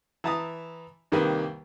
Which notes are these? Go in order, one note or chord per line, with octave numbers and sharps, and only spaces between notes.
E3 E5 A5 A#5 D#6
C2 D#3 G3 A#3 G4 B4